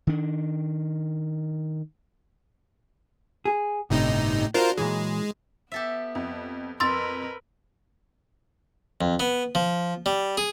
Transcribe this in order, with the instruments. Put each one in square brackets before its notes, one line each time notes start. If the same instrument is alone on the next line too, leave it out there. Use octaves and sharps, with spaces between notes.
[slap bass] D#3 D4
[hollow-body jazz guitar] G#4
[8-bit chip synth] G1 C3 D#4 [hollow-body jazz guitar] A2
[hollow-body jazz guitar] D4 F#4 [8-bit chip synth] F4 A#4 C5
[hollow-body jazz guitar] A#2 E3 F#3 [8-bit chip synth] G#3
[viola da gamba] B3 [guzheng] G4 A4 E5
[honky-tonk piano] F2
[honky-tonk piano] F2 E6 [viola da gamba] A#4 B4 [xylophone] C6 A6
[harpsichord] F2
B3
F3
G3
G#4